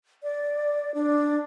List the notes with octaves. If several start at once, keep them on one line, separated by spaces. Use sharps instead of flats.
D5
D4